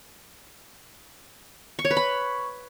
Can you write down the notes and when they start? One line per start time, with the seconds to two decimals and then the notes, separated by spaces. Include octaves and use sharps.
1.79 C#6
1.85 C#5
1.91 B4
1.97 B5